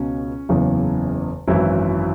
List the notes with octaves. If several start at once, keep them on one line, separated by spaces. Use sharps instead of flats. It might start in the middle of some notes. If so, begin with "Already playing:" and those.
Already playing: C#2 B2 C#4
F#1 E2 C#3 E3
G#1 F#2 E3 E4